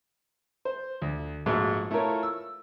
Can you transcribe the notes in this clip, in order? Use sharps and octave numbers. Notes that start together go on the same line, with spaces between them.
C5
D2
A#1 G#2 F#3 G#3 A3
A3 E4 F4 A4 A#4 C#5
E6